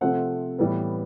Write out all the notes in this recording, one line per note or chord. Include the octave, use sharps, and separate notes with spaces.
C3 F3 A3 C4 F#5
A2 E3 G3 B3